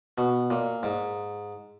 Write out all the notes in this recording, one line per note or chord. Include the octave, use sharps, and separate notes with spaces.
B2
A#2
G#2